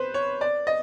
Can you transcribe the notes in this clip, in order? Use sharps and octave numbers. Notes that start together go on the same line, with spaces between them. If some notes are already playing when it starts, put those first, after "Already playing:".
Already playing: B4 C5
C#5
D5
D#5